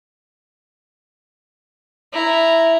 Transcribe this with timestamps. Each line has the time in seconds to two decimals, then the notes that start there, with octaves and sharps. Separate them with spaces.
2.13 E4 A#5